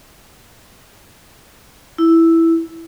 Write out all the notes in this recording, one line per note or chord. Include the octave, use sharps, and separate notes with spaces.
E4